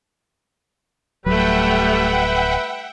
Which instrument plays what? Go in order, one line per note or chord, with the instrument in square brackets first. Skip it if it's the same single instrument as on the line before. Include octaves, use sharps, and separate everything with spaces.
[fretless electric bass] D1 F#3 [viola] G3 A3 [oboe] B4 [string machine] E5 F#5 G5